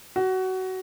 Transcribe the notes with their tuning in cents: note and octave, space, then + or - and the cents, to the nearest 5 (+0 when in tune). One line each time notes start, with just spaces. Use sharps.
F#4 +20